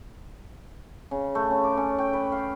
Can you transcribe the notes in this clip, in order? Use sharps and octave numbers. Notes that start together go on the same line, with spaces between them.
C#3
A3
C#3
D6
C#4
G5
B4
F5